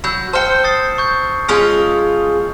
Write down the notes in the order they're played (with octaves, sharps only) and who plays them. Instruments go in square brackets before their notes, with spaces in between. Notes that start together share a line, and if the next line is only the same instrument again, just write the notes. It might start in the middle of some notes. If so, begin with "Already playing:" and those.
[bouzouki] F#3 [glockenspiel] B5 E6 G6
[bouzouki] C5 G5 [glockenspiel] A5 F6 C#7
[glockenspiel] D#6 A6 C7
C#6 G6
[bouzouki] G#3 C#4 F4